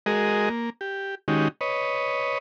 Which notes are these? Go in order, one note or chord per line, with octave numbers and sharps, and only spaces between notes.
G#3 F#4 G#4 A#4 D#5
A#3
G4
D#3 G#3 C#4 D#4 F#4 G4
B4 C#5 D#5